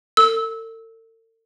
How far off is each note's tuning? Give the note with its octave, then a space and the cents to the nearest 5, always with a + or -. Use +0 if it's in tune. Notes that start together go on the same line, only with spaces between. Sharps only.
A4 +45 E6 -20